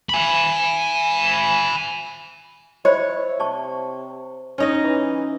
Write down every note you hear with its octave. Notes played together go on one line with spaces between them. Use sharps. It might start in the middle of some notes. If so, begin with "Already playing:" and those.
G#5 B5
E4 C5 C#5 D#5 B5
C3 D5 A5 C#6
C#4 D#4 D#5
E3